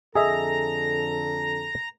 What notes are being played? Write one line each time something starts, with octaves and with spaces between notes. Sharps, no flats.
F2 D3 G#4 A4 D#5 E5 A#5